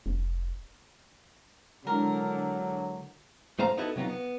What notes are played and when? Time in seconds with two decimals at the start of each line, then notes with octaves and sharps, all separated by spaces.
0.06 F1
1.87 D3 F#3 G#3 D4 E4 A#4
3.59 A2 A3 C5 F5 A#5
3.77 B3 D#4 E4 F#4 A4
3.96 C3 F#3 B3 D#4 F4
4.10 B3